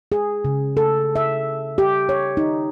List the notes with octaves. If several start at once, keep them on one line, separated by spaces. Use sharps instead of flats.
G#4
C#3
A4
E5
G4
C#5
D#4